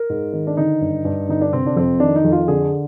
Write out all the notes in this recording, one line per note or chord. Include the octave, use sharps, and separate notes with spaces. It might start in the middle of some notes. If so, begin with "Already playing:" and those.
Already playing: A#4
G#2
D#3
D4
D3 D#4
G2
G2
D3 D#4
D4
C3 C4
D4
F2 C4
D#3 D4
D#4
F2
F4
D3 G#4